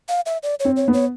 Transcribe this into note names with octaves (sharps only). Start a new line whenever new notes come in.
F5
E5
D5
C#5
C4
C#5
B3
C#5